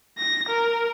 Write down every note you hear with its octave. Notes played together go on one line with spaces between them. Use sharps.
A#6
A#4